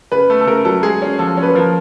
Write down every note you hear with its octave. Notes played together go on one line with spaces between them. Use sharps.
C#3 B4
A3
A4
C#3 A#4
F#3 A4
G#3 G#4
C#4
F3 A4
C#4
B4
F3 A#4